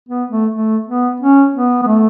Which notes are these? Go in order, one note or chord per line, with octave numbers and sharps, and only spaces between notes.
B3
A3
A3
B3
C#4
B3
B3
A3